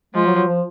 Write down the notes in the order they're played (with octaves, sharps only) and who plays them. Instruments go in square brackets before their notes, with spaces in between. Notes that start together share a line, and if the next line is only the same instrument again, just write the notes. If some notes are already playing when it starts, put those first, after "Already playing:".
[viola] F3 [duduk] G#3
[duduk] F#3
F#3
F3